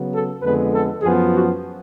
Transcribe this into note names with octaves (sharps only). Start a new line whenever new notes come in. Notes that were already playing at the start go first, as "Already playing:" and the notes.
Already playing: C#3 F#3 B3
A4
F2 D3 G#3 B3 B4
A4
F#2 F3 B3 G#4
F#4